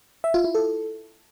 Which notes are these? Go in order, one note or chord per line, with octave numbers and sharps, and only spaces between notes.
E5
F4
E4
A4